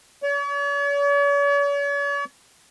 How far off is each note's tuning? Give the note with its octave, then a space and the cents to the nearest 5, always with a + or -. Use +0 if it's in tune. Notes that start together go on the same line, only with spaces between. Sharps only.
C#5 +45